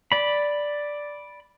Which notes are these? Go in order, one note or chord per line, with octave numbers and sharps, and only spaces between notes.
D5 B5